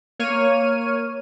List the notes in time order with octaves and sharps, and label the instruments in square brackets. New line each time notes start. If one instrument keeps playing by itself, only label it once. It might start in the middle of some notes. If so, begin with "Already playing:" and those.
[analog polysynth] A#3 C#5 F6 D#7